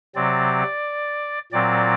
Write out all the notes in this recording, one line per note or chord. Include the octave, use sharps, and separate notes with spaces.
C3 F#3 C4 D5
A#2 F#3 C4 D5